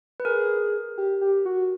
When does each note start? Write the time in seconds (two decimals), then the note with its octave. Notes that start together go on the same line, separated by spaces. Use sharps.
0.20 B4
0.25 G#4 A#4
0.98 G4
1.21 G4
1.45 F#4